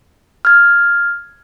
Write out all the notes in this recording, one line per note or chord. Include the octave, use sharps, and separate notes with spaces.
F6 G#6